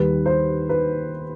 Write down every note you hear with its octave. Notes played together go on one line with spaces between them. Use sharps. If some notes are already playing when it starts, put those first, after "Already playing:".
Already playing: D#2 D#3 G3 B4
C5
B4